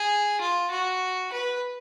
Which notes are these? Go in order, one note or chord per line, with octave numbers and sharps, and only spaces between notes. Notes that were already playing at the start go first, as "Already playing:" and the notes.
Already playing: G#4
F4
F#4
B4